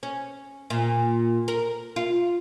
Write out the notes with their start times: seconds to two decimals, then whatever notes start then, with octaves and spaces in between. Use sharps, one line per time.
0.03 C#4
0.70 A#2
1.48 A#4
1.96 F4